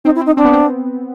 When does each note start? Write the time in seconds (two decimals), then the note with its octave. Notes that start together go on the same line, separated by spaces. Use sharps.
0.04 C4 D#4
0.15 E4
0.21 C4 D#4
0.37 C4 D4
0.45 B3
0.52 C4